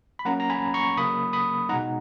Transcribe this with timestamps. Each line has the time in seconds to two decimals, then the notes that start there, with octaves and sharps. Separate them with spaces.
0.19 B5
0.25 F#3 A#3 C#4 F#5 A#5
0.40 A#5
0.50 G#5 B5
0.74 A#5 C#6
0.97 C#3 F#3 A#3 B5 D#6
1.33 B5 D#6
1.69 B2 G#3 D#4 F#5 A#5